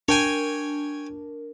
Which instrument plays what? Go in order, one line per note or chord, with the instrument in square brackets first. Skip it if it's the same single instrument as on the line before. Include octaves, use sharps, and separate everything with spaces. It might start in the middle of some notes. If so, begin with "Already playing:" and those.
[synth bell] D4 A#4 [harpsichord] C#5 G5 G#5